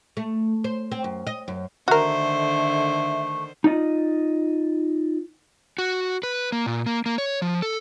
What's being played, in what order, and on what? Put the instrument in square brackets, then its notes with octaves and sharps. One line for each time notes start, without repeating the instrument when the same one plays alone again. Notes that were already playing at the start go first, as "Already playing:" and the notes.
[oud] A3
C5
C4
F#2
D#5
F#2
[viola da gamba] D3 D#3 C5 [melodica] A3 [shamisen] F#4 A#4 [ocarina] E5
[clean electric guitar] D#4 F4 D5 D#5
[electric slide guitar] F#4
B4
A#3
A#2
A#3
A#3
C#5
F3
A4